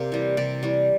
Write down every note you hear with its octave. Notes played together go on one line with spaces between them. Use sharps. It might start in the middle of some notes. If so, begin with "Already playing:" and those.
Already playing: C3 A#3 D5
E3 G3
C3 D5
E3 G3